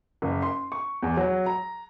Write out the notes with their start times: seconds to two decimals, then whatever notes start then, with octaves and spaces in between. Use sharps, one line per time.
0.22 F#1
0.42 C6
0.72 C#6
1.03 E2
1.17 F#3
1.46 A#5